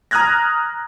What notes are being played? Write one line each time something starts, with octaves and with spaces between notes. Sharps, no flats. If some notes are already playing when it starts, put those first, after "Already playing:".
A#5 D#6 F6 F#6 G#6 A#6